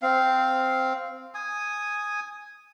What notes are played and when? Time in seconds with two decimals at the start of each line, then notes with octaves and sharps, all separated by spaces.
0.02 C4 F5
1.35 G#5 D#6